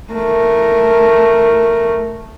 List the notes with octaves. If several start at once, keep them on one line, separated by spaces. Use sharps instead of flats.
A3 A#4